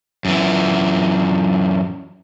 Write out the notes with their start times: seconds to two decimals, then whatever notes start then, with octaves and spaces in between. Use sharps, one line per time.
0.25 F#2 E3